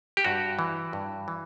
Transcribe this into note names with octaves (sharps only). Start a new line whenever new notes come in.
G4
G2 F#4
E3
G2
E3